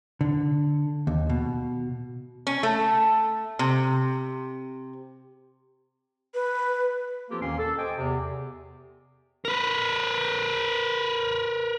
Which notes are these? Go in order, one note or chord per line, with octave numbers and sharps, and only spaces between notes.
D3
D#2
B2
C#4
A3
C3
B4
F3 A#3 C4 F4 G4 A4
D#2 A#2 D#3 A#3 C#4 C6
A4
C5 D#5 G5 G#5 D6
E2 C3
A#4 B4